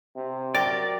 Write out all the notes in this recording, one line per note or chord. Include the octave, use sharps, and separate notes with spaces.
C3
F#3 G4 A#4 D5 A6